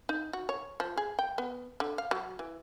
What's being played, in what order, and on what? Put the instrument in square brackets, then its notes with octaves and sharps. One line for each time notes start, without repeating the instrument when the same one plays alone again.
[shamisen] D#4
F#4
C#5
F3
G#4
G5
B3
D3
F5
F#3
E3